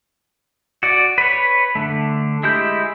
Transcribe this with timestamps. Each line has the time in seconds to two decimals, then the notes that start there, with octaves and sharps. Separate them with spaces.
0.83 F#4 D5
1.18 B4 C#5
1.75 D3 A3
2.43 G#3 E4 G4 G6